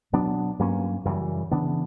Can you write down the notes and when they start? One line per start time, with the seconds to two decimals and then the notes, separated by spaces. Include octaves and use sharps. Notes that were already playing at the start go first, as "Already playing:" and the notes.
0.13 B2 F#3 B3 D4
0.59 G2 F#3 A#3 C#4
1.05 F#2 C#3 E3 G3
1.51 C#3 E3 B3 D4